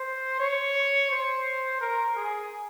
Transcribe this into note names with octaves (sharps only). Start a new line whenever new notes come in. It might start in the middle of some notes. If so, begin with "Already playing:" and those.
Already playing: C5
C#5
C5
A#4
G#4